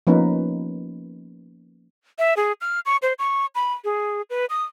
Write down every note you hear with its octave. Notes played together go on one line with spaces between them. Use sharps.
F3 A#3 B3 C#4 D#4 B4
E5
G#4
F6
C#6
C5
C#6
B5
G#4
B4
D#6